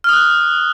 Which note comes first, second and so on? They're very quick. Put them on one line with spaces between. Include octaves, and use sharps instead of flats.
F6 D#6 F#6